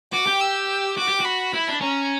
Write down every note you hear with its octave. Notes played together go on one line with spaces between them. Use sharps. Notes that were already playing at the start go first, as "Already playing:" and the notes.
F#4 D6
G4
E6
F#4 D6
G4
F#4 B5
E4
D4
C#4 A#5